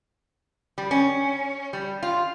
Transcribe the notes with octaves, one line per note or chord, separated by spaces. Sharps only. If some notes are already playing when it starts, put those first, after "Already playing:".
G3
C#4
G3
F4